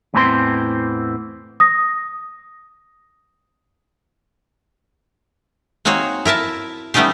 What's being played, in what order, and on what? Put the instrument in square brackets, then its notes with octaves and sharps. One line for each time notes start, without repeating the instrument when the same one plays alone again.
[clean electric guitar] E2 A2 E3 C4 A#5 C6
[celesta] D#6 A#6
[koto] A#3 C4 D#4 F#4 G#4 C#5
E4 A#4 E5 A5
G3 A3 B3 C#4 D#4 G4